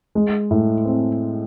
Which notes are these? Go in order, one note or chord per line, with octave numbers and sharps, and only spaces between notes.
G#3
A2
C4